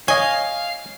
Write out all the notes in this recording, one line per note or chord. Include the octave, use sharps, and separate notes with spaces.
C#5 D#5 F5 G#5